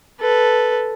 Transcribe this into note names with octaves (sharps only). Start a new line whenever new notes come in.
A4 B4